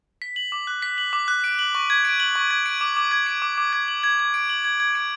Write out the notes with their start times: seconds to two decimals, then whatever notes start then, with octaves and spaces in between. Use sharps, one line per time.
0.22 B6
0.36 F#7
0.52 D6
0.67 F#6
0.82 B6
0.98 F#7
1.13 D6
1.28 F#6
1.44 D7
1.59 F#7
1.75 C#6
1.90 G#6
2.05 D7
2.20 F#7
2.35 C#6
2.51 G#6
2.66 D7
2.81 D6
2.97 D6
3.11 G#6
3.27 D7
3.42 D6
3.57 D6
3.73 G#6
3.88 F#7
4.03 G#6
4.19 G#6
4.34 D7
4.49 F#7
4.64 G#6
4.80 G#6
4.95 D7